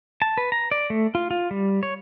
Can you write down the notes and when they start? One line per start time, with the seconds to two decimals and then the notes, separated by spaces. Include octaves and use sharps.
0.22 A5
0.38 B4
0.52 A#5
0.71 D5
0.90 A3
1.15 F4
1.31 F4
1.51 G3
1.83 C#5